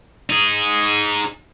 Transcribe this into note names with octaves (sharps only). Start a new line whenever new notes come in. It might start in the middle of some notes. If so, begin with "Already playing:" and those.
D#4 G#4